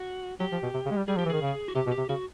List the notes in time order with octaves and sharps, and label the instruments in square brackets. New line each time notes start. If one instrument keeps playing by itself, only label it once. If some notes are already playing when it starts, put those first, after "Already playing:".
Already playing: [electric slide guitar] F#4
[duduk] F#3 [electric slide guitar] G4
[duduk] F3
B2
C3
C#3
G#3
G3
[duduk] G3 [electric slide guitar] G#4
[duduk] F3 [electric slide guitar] G4
[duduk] E3
[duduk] D#3 [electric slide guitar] G#4
[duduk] C#3
[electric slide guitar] F#4
[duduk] C3 [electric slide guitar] G4
[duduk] B2
[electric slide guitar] G4
[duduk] C3
[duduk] C#3 [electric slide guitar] F#4